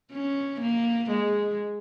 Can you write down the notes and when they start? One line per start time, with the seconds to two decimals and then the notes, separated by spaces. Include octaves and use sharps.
0.12 C#4
0.61 A#3
1.11 G#3